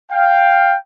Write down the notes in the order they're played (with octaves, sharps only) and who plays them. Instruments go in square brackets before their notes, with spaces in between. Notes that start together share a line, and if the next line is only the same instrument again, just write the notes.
[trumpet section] F5 G5